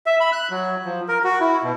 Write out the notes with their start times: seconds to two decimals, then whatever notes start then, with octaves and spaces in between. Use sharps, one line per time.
0.06 E5
0.20 B5
0.32 F#6
0.50 F#3
0.85 F3
1.08 A#4
1.24 F#4
1.40 E4
1.63 B2